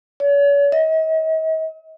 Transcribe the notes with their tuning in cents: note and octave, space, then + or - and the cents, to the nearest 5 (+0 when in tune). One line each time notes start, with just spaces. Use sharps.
C#5 +40
D#5 +45